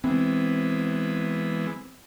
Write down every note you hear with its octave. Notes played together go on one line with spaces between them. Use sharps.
E3 G#3 B3 C4